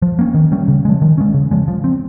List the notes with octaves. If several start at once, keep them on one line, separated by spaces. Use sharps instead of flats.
F3
A#3 C#4
D#3
G3 C#4
C#3
F3 G#3
D#3
G#3 C#4
C#3
F3 G#3
F3
C4